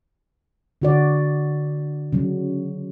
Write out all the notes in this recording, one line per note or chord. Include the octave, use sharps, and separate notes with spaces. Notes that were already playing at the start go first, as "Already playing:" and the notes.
D3 F#4 D5
C#3 F#3